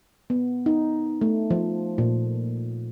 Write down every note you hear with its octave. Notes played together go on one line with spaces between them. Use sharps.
B3
D#4
A3
F3
A#2